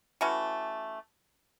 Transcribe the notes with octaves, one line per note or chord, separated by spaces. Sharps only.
E3 A3 C#4 F#4